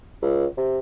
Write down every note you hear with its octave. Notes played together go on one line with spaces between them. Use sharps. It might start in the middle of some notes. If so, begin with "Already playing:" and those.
C#2
C3